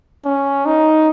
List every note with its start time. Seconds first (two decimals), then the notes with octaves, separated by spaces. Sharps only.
0.25 C#4
0.66 D#4